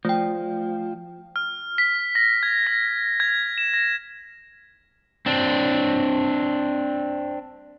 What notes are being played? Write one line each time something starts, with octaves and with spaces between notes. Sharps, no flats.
F3 A3 G5
F6
B6
A#6
G#6
A#6
G#6
E7
A#6
C4 D4